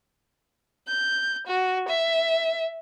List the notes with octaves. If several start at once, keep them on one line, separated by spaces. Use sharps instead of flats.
G6
F#4
E5